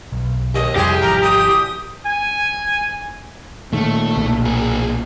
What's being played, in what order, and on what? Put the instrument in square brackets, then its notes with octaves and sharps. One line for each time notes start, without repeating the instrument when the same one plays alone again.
[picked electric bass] B1
[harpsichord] D#2 [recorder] D#5
[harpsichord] C2 E4 C6 [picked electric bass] F2 [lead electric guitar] G4 [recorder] G#4
[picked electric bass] G#1 F3 [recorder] A#5
[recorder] D#6
[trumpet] G#5
[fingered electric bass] A#2 D#3 [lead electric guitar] A3
[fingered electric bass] B1 A#2
[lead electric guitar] G#4 A#4